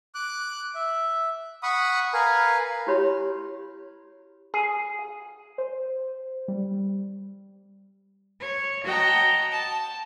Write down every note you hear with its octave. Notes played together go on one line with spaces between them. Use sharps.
D6 F#6
E5
F#5 B5 C#6 D#6
A#4 B4 F5 G#5
E4 F#4 G4 C#5 B5 C6
G#4
C5
G3
C#5
F#4 D#5 F#5 G5 A5 A#5
A5